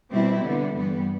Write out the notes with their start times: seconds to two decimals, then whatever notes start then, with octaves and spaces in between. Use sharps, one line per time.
0.11 B2 G3 C4 E4
0.43 D3 G3 B3
0.74 G2 E3 G3 B3